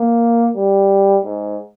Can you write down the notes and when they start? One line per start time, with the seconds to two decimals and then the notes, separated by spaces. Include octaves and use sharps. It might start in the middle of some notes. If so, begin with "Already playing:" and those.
Already playing: A#3
0.56 G3
1.25 G#2